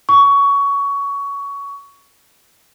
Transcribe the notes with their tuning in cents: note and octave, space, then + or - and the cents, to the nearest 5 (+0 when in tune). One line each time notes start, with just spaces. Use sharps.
C#6 +20